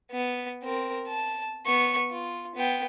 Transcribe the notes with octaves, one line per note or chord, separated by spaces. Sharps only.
B3
C4 A#4
A5
B3 C#6
F4
B3 G5